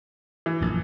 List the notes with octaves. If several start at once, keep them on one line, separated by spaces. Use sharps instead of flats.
E3
A#1 F#2